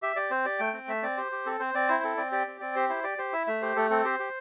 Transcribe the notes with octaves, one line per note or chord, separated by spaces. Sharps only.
G4 E5
G4 D5
C4 C5
G4 D5
A3 G5
C4
A3 E5
C4 D5
G4 C5
G4
C4 A4
C4 C5
C4 D5
E4 C5
C4 A4
C4 D5
G4 D5
C4
C4 D5
G4 C5
E4 C5
G4 D5
G4 C5
E4 E5
A3 E5
G4 C5
A3 A4
C4 A4
G4 C5
G4